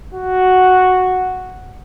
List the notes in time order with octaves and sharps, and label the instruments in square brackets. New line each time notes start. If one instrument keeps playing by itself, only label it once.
[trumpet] F#4